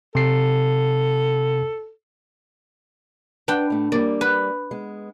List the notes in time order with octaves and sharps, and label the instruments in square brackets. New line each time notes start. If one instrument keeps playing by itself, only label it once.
[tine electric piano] C3 C7 [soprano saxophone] A4
[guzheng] D4 G5 [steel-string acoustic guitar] B4
[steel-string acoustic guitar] A2 A3
[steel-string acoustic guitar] G3 A#3 [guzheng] D5
[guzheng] B4
[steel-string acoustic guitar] G#3 B3